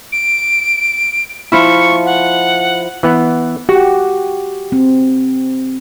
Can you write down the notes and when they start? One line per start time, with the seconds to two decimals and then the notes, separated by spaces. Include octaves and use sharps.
0.12 D7
1.52 F3 E4 C#6
2.05 F#5
3.03 E3 B3 F#5
3.69 F#4 G4 F#5
4.72 C4